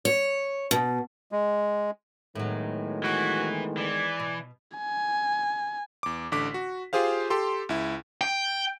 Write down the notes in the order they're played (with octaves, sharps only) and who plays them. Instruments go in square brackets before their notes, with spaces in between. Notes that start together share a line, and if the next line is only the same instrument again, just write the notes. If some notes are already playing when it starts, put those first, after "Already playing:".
[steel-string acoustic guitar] C#5
B2
[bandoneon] G#3
[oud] A2 F#3 [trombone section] D#3 G#3 B3
[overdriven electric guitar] E3 [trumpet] F#4
[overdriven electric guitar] E3 [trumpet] D5
[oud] B2
[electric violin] G#5
[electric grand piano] E2 D6
A1 D3 D6 B6
F#4
F4 G4 G#4 C5 F5
G4 A4 C6
C#2 E4
[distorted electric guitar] G5